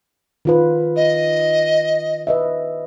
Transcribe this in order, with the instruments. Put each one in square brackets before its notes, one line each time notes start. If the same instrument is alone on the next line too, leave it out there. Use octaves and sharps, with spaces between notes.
[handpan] D#3 F4 B4
[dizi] D#5
[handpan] B4 D#5 E5